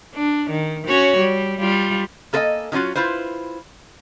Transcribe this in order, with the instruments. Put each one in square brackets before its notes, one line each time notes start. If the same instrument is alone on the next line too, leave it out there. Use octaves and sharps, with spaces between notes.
[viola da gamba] D4
D#3
C#4 F#4 C#5
G3
G3 F4
[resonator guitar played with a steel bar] A#3 A4 B4 D5 D#5 G#5
D#3 F#3 C#4 F4 F#4
E4 F4 B4 C5